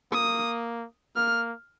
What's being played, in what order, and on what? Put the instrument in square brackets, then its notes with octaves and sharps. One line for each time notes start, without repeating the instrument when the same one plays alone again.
[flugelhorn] A#3 [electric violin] D#6
[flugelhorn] A#3 [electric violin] F6